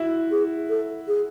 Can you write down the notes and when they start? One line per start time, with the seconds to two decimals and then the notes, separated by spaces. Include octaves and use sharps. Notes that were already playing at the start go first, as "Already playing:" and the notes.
Already playing: E4 F#4
0.31 G#4
0.69 A4
1.08 G#4